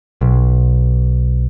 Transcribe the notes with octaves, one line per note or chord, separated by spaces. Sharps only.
B1